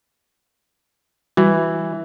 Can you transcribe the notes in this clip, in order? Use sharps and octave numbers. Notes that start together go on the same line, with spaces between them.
E3 G3 F#4